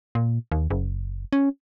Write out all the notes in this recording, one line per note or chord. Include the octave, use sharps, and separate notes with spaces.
A#2
D#2
F#1
C#4